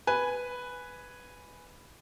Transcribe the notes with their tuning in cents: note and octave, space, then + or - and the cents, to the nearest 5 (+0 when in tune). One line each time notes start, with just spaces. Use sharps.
B4 +0 G#5 +0